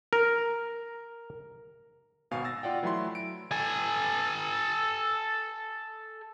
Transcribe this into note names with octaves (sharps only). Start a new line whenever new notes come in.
A#4
G#1 B2 F5 G#5
E6 A6 A#6
F4 D5 F#5 G5
E3 F#3 A3 E5 B5 C6
D7
A4 G#5